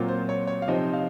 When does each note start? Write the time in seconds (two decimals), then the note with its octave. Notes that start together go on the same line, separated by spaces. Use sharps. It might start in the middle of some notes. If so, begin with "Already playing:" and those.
Already playing: A#2 F#3 C4 F4
0.08 C5
0.29 C#5
0.47 C#5
0.62 F5
0.68 C3 F3 C4 D#4 D#5
0.93 F5